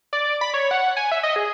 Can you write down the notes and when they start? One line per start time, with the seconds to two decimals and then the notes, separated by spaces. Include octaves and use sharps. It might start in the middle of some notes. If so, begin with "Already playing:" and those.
0.13 D5
0.41 B5
0.54 C#5
0.71 F#5
0.97 G#5
1.12 E5
1.23 D#5
1.36 G#4